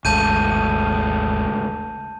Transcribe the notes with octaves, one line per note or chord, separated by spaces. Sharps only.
G#1 D#2 C#3 G#3 A3 A5 G6 D#7